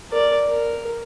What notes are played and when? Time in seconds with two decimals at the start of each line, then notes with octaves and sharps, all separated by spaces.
0.11 A#4 D5
0.46 A#4